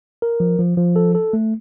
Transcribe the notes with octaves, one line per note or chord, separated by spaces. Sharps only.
A#4
F3
F3
F3
A4
A4
A3